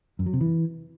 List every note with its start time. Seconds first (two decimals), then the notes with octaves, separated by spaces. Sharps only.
0.19 F#2
0.26 F#3
0.33 C3
0.41 E3